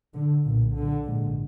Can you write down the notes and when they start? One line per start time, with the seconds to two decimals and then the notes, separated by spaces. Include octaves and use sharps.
0.14 D3
0.44 B1 A#2
0.74 D3
1.04 A#1 G#2